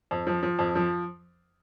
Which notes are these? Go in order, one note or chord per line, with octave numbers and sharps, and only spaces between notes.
F2
F3
F3
F2
F3